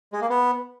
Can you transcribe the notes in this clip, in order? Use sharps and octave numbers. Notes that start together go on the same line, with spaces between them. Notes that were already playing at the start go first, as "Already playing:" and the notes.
G#3
A#3
B3